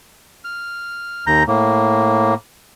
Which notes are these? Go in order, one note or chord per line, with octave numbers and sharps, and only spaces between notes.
F6
D#2 A#5 G6
A2 A#3